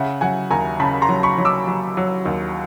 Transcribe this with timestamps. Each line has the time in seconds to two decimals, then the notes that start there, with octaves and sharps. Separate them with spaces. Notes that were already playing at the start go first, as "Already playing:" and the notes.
Already playing: C#3 E5 F#5
0.21 F#3 F#5 G#5
0.50 D#2 G#5 A#5
0.80 C#3 A5 B5
1.02 A#5 C6
1.09 F#3
1.23 B5 C#6
1.38 F#3
1.45 D6 E6
1.67 F#3
1.97 F#3
2.26 D#2